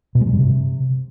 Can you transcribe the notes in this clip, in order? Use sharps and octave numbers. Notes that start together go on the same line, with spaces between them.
B2
G#3
F#3
G2
C3